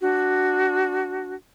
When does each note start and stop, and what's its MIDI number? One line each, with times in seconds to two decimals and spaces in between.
0.01 1.35 62
0.01 1.35 66